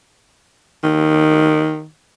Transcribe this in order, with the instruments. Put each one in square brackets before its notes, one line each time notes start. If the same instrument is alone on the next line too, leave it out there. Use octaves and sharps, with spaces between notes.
[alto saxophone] D#3